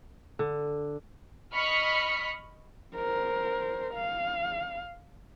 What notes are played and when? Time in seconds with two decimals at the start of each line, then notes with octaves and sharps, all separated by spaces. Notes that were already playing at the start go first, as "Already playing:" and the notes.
0.39 D3
1.53 D#5 B5 C#6 F6 B6 C#7
2.95 A#4 C5
3.94 F5